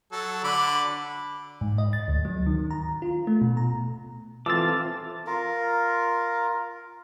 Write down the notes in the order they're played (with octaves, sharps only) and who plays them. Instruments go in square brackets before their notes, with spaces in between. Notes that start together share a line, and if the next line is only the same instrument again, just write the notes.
[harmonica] F#3 A4
D3 B5 D6
[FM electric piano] G#2
D#5
A6
D2
F#3
D#3
A#5
F4
A3
B2
A#5
[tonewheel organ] E3 F4 [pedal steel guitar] C4 A4 D6 [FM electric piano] A5 E6 A6
[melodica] F4 A#4